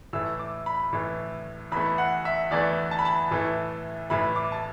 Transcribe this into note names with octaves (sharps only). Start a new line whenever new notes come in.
A2 E3 A3 E6
D6
B5
A2 E3 A3
E2 E3 A3 B5
F#5
E5
E2 E3 A3 D5
A5
B5
A5
A2 E3 A3
A2 E3 A3 B5
D6
A5